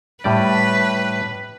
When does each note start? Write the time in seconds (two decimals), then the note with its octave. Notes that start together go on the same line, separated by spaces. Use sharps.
0.24 A2 G3 B4 D5